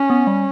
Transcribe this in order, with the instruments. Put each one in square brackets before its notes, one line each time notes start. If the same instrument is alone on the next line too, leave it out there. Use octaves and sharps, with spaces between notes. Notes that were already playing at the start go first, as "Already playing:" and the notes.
Already playing: [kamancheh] C#4
[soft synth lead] B3
G3